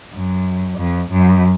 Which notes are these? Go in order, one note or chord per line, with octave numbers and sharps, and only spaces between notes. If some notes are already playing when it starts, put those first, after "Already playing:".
F#2
F2
F#2